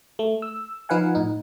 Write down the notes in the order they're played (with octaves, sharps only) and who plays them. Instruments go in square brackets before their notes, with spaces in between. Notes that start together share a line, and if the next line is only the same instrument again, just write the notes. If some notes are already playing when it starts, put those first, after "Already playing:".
[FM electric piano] A3
E6
F3 D#4 B4 F5 F#5 G#5
A2 D#4